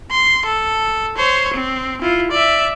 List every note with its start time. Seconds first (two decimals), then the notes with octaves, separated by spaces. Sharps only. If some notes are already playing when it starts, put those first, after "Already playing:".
0.11 C6
0.46 A4
1.17 C5 C#5
1.54 C4
2.02 E4 F4
2.31 D5 E5